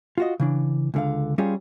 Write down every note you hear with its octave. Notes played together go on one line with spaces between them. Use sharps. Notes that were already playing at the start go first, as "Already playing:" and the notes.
F4 F#4 D#5
C#3 E3 D4
C#2 D3 F5
G3 C#4 F4 G4 G#4